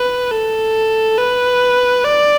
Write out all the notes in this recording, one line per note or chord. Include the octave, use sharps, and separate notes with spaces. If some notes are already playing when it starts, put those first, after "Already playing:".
Already playing: B4
A4
B4
D5